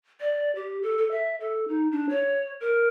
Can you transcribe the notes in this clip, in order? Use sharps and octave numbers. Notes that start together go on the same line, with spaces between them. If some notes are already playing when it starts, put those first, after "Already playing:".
D5
G4
A4
A4
E5
A4
D#4
D4
C#5
A#4